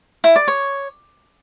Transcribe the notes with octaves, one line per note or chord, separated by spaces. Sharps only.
E4
D5
C#5